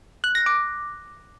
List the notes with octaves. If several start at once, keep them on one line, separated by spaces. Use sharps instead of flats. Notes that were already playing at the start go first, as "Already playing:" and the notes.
F#6
A#6
D6